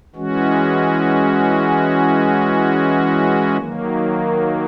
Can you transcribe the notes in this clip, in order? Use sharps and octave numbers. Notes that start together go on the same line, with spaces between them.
E3 G#3 C#4 F#4
D#3 F#3 A#3